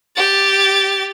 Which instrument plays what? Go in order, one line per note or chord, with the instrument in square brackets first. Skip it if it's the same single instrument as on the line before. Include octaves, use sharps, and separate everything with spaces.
[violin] G4 A6